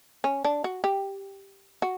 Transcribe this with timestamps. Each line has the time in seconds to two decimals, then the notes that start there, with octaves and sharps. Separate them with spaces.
0.24 C#4
0.44 D4
0.64 F#4
0.84 G4
1.82 F#4